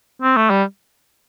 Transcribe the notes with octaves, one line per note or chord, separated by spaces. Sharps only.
C4
A3
G3